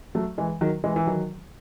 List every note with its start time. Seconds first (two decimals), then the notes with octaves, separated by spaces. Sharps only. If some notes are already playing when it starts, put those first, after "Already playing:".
0.15 F#3 A3
0.38 E3 G#3
0.61 D#3 F#3
0.84 E3 G#3
0.96 E3
1.07 D#3 F#3